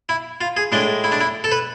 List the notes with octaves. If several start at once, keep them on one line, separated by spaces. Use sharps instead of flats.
E4
F4
G#4
A2 G#3 D4
E4
D4
E4
A4
B4